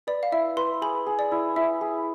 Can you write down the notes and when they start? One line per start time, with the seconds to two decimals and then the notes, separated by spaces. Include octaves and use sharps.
0.07 B4 D5
0.23 F5
0.32 E4 E5
0.57 B4 C6
0.82 G#4 B5
1.07 G#4
1.19 D5
1.32 E4
1.56 E4 E5
1.81 G#4